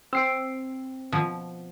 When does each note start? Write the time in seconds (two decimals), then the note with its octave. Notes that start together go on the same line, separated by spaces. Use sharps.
0.13 C4 E6 C7 D7
1.12 B2 F3